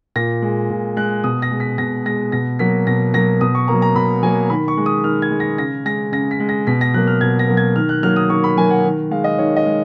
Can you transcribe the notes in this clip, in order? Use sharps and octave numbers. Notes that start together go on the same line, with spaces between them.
A#2 A#6
G#3
A#2
G#3 F#6
B2 D#6
A#6
G#3
B6
B2 A#6
G#3 A#6
B2 A#6
F#3 A#3 B6
B2 A#6
F#3 A#3 A#6
B2 D#6
C#6
F#3 A#3 A#5
A#5
B2 B5
F#3 A#3 G#5
D#3 B5
C#6
G#3
D#6
D#3 F6
G#6
G#3
A#6
C#3 A#6
G#3 A#6
C#3 A#6
B6
G#3
A#6
B2 B6
A#6
F#3 A#3 F#6
F6
B2 G#6
A#6
F#3 A#3
G#6
D#3 F6
F#6
F#3 A#3 F6
D#6
D#3 C#6
B5
F#3 A#3 G#5
F#5
D#3
G#3 F5
D#5
D#3 C#5
D#5
G#3